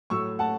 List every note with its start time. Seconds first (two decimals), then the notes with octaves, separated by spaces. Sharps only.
0.10 A2 F#3 A3 C#6 E6
0.39 F#5 A5